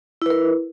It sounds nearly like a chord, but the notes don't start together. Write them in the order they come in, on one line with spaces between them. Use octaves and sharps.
E4 B4 A#4